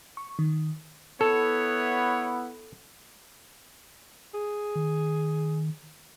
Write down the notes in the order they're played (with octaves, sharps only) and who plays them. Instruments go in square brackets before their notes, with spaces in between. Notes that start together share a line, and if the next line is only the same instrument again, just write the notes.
[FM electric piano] C#6
D#3
[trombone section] B3 E4 [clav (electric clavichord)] A4 [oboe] C#5
[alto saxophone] G#4
[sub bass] D#3